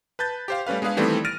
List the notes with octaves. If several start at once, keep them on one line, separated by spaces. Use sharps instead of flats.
B4 A5 G6 A6
G4 C5 F5
G3 A3 C#4 B4 F5
G#3 B3 D4 G#4 B4 F5
D#3 E3 G3 A3 B3 C4
F6 A6 A#6 D7 D#7